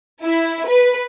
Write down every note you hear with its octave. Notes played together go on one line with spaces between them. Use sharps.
E4
B4